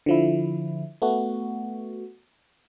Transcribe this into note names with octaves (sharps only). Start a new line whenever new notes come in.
D3 F3 E4
A3 B3 F#4